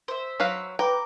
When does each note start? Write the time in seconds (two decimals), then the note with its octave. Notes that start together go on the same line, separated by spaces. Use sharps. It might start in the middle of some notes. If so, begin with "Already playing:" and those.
0.08 C5 E5
0.40 F#3 B4 F5
0.79 B4 G5 A#5 D6